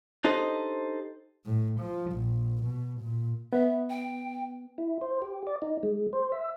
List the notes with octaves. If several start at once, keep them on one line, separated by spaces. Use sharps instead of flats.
D4 D#4 G4 A4 C5 D#5
A2
F3
A#1
B2
A#2
B3 E5
G5
E4
C5
G4
D5
D#4
G#3
C5
E5